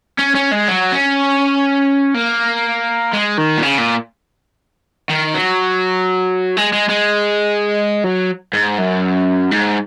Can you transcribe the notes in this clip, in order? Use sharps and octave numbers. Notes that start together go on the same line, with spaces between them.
C#4
C#4
G#3
F#3
C#4
A#3
G#3
D#3
A#2
C#3
A#2
D#3
F#3
G#3
G#3
G#3
F#3
G#2
F#2
G#2